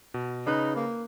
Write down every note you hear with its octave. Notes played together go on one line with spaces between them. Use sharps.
B2
C#3 D#4 B4 F#6
A#3